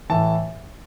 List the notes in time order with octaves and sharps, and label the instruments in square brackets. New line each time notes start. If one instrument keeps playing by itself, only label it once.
[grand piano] A2 E3 A5